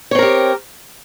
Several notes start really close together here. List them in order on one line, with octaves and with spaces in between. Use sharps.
C#5 C4 A#4 G4